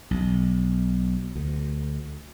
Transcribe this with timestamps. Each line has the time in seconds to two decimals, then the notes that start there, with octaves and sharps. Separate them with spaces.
0.11 B1
1.36 D2